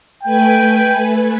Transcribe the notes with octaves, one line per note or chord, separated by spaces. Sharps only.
A3 B4 G5 G#5